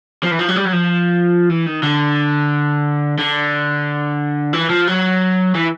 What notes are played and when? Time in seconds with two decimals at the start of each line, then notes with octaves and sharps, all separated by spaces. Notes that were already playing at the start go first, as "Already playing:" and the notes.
0.23 F3
0.31 E3
0.39 F3
0.49 F#3
0.56 G3
0.65 F#3
0.73 F3
1.50 E3
1.66 D#3
1.83 D3
3.18 D3
4.53 E3
4.69 F3
4.87 F#3
5.55 E3